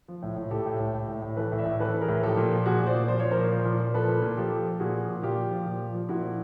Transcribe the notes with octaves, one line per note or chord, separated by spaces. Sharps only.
F3
A2
A2
A2 G4 A4
A2
A2
A2
A2
A2
E3 A4 B4
A2
D5 E5
A2
E3 A4 B4
E3
G#4 A#4
A2
F3 G4 A4
A#2
F3
A#2 F#4 G#4
A#2
C5 D5
A#2
F3 C5
F3 C#5
A#4 C5
A#2
F3
A#2
A#2
F3 A4 B4
A#2
A#2
F3 G4 A4
F3
F3
A#2 F#4 G#4
F3
A#2
A#2 F4 G4
F3
F3
A#2
F3
F3
A#2 E4 F#4
F3